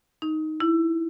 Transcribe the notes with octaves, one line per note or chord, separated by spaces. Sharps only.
D#4
E4